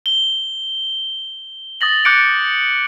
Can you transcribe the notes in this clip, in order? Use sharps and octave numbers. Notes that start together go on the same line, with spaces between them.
G7
D#6 A6 A#6 F#7
D6 F#6 G6 C#7 D7